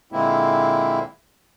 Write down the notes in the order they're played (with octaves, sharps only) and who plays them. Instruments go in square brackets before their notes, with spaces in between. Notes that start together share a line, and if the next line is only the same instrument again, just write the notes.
[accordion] A#2 D3 G#3 A#3 C4 E4